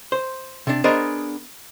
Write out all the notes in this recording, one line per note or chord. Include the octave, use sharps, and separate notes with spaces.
C5
C3 D4
B3 D4 G#4 A#4 C5 D#5